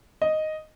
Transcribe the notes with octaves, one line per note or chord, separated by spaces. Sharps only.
D#5